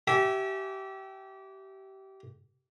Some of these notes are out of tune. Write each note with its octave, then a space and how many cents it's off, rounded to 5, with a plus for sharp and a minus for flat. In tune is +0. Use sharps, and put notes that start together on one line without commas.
G4 -25 E5 +0 G#5 +0